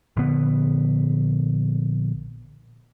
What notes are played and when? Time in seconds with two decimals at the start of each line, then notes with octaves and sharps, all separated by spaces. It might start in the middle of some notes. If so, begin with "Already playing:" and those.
0.17 A#1 D3 B3